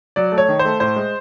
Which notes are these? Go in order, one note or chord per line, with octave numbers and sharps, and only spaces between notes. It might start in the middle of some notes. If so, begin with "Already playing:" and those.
F#3 D5
A3
C#5
D#3
C5
A3
A2 C5
G#3